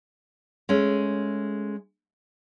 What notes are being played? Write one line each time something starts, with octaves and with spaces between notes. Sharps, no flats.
G#3 A3 C#4